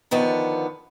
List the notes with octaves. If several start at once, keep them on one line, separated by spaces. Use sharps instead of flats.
D3 D#3 F3 B3